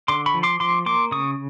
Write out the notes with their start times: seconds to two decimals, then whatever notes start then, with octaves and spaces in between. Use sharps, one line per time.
0.08 D3 C6 D6
0.26 B5 C#6
0.34 F3
0.43 C6 D6
0.60 F3 C6 D6
0.86 A#3 C6 D6
1.11 C#3 C#6 D#6